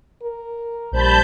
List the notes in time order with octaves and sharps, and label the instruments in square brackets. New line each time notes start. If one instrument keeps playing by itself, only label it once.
[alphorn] A#4
[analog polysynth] A#1 G3 C5 [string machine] A5 B5 G6